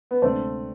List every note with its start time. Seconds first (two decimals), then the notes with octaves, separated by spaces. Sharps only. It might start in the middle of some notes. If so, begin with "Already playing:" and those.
0.11 B3
0.22 D2 C3 G#3 A3 C4 D4